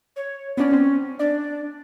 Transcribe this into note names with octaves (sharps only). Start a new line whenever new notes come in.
C#5
B3 C#4 D4
C4
D4 D5